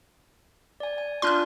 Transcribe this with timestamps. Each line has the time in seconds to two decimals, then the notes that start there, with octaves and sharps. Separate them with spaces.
0.80 D5 G#5
0.98 G#5
1.22 D4 F4 D5 C6 F6 F#6